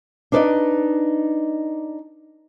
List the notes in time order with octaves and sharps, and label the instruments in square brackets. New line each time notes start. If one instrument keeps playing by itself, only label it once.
[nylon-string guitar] D4 D#4 B4 C5 D5 D#5